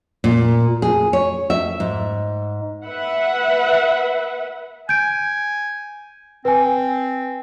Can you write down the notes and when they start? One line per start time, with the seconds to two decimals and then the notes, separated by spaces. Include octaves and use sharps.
0.24 A#2
0.82 G#4
1.13 C#5
1.50 E5
1.80 G#2
2.86 B4 E5 F#5
4.89 G#5 G6 D7
6.45 C4 B4 G#5